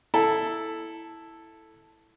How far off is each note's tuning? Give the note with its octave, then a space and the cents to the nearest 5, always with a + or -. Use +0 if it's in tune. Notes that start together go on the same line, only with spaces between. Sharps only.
E4 +0 A4 +0